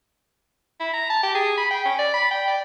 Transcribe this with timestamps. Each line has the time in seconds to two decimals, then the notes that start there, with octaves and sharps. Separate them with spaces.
0.80 E4
0.93 A#5
1.10 A5
1.23 G4
1.35 G#4
1.57 B5
1.71 G5
1.85 C#4
1.99 D5
2.14 B5
2.31 G5
2.48 D5